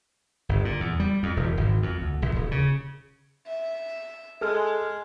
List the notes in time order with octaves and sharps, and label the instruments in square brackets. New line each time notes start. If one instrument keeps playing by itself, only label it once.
[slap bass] G1
A#2
E2
G3
F2
E1
G#1
F2
D2
A#1
D#1
C#3
[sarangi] E5
[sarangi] G#3 [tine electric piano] G#4 A4 F6